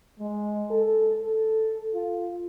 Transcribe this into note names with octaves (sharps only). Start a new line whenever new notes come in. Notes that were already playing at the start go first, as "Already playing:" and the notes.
G#3
A4
A4
F4